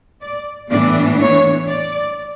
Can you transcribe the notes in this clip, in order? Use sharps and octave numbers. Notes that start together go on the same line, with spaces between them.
D5
A2 E3 B3 D4 D5
C#5
D5